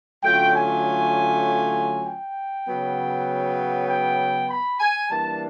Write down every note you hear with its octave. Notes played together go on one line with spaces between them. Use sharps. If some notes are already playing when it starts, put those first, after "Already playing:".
D3 F#3 A3 C#4 F4 G5
G#5
G5
C#3 F#3 B3
G5
B5
G#5
E3 G3 A#3 D4 A5